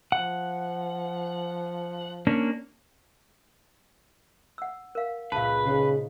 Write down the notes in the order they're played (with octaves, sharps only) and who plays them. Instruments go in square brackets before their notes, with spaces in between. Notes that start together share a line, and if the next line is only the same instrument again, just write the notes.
[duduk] F3 [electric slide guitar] F#5
[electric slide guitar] A#3 C#4 D4
[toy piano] F#5 E6
A#4 F5
[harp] C#2 A#2 [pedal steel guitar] B4 [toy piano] F5 A5
[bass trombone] C#3 [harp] D#4 C5